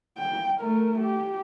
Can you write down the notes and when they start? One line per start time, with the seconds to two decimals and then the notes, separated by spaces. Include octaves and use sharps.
0.18 G5
0.60 A3 A#4
0.99 G4